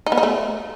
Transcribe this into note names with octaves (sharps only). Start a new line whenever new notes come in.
D#4
B3
D#4
A3